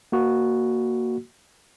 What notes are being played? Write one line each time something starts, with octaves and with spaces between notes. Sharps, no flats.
A#3 F#4